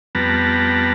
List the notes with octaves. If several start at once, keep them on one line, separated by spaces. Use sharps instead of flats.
F2 G3 B3 B4 A5 A#5